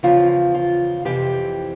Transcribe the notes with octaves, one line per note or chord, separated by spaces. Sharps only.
E2 C#3 F3 F4
F4
F2 C3 E3 G4